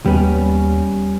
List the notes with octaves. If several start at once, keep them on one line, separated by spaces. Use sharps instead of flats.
D#2 G3 B3 C#4